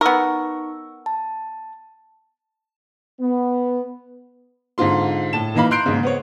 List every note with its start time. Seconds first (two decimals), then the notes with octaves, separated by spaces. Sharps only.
0.01 B3 D#4 A#4 C#6 E6
1.06 A5
3.20 B3
4.78 G#2 D3 C4 F4 C6
5.33 A2 A5 E7
5.54 A#2 E3 D#4 F5 B5
5.71 A#5 C6 F#6 G6 C7 D7
5.86 D#2 G#2 C#3
6.03 B3 C4 C#5